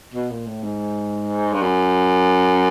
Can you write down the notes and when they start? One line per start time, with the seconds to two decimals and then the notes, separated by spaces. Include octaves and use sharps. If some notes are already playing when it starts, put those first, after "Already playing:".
0.14 B2
0.31 A#2
0.46 A2
0.63 G#2
1.53 G2
1.61 F#2